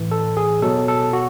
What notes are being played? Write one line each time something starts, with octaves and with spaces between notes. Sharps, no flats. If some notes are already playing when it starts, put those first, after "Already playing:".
Already playing: A2 E3
A4
G#4
B2 F#3 A4
A4
F#4